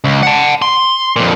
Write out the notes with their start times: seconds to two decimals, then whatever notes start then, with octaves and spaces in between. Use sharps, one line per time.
0.04 C#2
0.23 F#5 A5
0.62 C6
1.16 F2 A#2